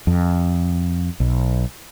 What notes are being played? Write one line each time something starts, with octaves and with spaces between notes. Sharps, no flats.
F2
B1